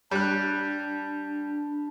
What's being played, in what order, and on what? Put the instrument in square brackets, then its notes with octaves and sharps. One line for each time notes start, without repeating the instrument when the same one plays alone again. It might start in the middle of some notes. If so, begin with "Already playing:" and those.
[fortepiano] G3 F#6 [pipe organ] D4